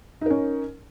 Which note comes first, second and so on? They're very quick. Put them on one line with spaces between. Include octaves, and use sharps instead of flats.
D#4 A#4 C#4